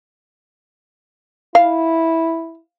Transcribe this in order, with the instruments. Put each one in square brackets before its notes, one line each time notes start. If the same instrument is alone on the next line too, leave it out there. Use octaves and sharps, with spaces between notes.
[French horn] E4 [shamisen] F5